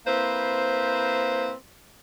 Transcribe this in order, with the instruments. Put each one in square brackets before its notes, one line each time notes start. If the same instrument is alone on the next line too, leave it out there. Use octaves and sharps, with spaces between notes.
[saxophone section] A#3 C4 E4 B4 C5